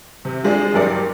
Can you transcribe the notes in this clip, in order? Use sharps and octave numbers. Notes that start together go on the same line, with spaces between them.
C3
F3 G#3 D4
F#1 G2 G4 A#4 D5 C#7